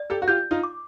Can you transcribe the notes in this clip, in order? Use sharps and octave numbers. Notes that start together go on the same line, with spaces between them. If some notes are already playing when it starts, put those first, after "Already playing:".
Already playing: D5
G4 A4
F#4
F4 G4 G6
D#4 F4
D6